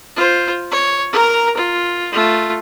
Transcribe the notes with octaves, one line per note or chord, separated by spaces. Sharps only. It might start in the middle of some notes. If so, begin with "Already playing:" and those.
F4 C5
C#5
A#4 A#5
F4
A3 F4